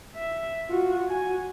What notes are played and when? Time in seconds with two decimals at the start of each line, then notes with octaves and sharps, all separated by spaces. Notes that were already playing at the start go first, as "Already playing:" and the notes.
0.15 E5
0.69 F4 F#4
1.08 F#4 G#5